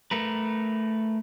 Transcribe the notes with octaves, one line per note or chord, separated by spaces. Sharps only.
A3 A#4 B4